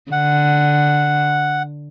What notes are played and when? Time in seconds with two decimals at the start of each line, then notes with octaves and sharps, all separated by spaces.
0.12 D3 F#5